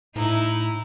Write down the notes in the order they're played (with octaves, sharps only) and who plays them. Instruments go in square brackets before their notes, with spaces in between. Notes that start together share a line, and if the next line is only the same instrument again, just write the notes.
[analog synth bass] A2 [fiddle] D#4 [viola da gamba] E4